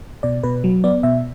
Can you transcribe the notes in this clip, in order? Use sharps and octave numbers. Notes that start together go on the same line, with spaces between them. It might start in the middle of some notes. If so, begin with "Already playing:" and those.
B2 D5
B2 B4
F#3
B3 D5
B2 E5